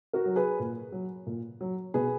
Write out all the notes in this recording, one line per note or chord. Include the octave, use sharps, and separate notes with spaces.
F#4 A#4
F#3
G#4 B4
A#2
F#3
A#2
F#3
B2 G#4 B4